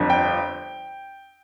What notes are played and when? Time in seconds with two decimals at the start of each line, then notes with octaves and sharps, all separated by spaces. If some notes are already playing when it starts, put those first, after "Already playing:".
Already playing: G1 F2 D3
0.10 G5